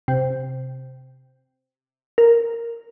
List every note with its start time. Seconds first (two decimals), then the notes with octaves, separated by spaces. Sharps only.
0.08 C3
2.18 A#4